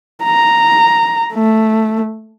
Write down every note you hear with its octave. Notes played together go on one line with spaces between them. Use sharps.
A#5
A3